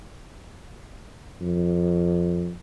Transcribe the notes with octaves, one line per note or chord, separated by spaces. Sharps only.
F2